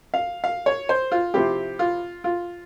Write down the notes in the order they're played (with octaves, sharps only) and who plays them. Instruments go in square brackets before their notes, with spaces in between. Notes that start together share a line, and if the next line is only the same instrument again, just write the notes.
[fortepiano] F5
F5
C#5
C5
F4
C3 F3 C4 E4 G4
F4
F4